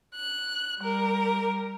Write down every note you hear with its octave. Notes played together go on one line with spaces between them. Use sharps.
F#6
G3 A#4